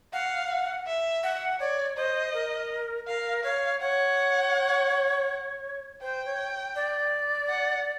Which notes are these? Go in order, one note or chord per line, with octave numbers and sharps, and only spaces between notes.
F5 F#5
E5
F#5
C#5 D5
C5 D#5
A#4
A#4 F5
C#5 F5
C#5 F#5
C5 G5
C#5
D5
F#5